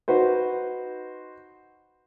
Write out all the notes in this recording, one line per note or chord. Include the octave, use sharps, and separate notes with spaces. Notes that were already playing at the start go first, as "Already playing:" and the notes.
D#4 F#4 B4 C5